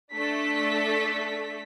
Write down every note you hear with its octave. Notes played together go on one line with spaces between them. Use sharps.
A3 D4 A4 B6